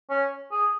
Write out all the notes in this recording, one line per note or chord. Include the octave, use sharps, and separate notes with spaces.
C#4
G#4